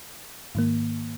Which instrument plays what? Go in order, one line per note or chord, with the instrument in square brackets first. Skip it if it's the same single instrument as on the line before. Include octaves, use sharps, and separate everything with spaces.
[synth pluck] G#2 D#3 A#3